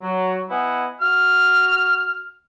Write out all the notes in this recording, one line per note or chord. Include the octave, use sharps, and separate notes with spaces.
F#3
B3 E4 D#5 F#5 G#5
F#4 F6